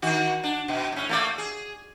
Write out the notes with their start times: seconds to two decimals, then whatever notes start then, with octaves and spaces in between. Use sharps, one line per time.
0.02 D#3 F#4
0.44 D4
0.68 B2
0.92 A2 C#4
1.09 A3 A#3 D5
1.38 G#4